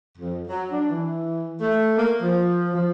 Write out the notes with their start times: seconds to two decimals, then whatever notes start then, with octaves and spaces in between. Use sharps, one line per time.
0.18 F2
0.48 F#3
0.71 D4
0.90 E3
1.60 A3
1.97 A#3
2.21 F3
2.73 F3